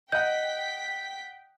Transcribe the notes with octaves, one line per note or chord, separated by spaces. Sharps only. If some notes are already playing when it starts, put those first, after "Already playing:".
D#5 F#5 G5 F#6 G6 B6